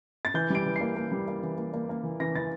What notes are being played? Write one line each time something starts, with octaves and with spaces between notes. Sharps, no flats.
A6
E3 G6
G3 D7
E3
C7
A#3
A#3
G3
A#3
E3
A#3
A#3
A#3
E3
E3 A#6
E3 A6